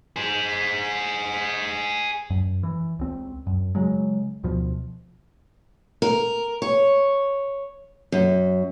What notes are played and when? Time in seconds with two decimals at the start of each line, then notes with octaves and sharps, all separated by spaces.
0.16 G#4 C5
2.30 F#2
2.63 E3
2.99 C#2 C4
3.47 F#2
3.75 C#3 F#3 G#3
4.43 D2 B2 F3
6.02 A#4
6.62 C#5
8.12 F#2